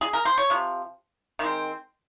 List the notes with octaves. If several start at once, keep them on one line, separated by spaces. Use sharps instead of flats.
G#4
A#4
C5
C#5
C3 F3
D#3 G#3 C4